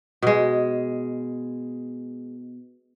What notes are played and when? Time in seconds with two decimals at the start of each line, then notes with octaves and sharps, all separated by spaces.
0.22 B2 G#3